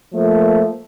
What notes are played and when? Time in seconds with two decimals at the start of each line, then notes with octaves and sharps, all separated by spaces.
0.13 F3 A3 A#3